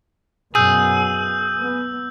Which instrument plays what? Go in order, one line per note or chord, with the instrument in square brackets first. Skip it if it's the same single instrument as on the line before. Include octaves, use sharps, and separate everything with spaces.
[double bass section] F#2 B2 B3 [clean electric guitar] G#4 [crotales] E6 G6
[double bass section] B3